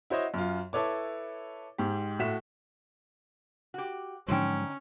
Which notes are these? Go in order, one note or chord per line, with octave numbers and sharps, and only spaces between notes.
E4 F#4 C5 C#5 D#5
F#2 F4
E4 A4 B4 C#5 D6
G#2 G4
A2 E4 F#4 B6 E7
F#4 G4
G#2 D3 F3 F#3 C#4 D#4 G5